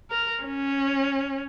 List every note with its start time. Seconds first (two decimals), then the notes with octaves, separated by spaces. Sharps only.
0.10 A#4
0.44 C#4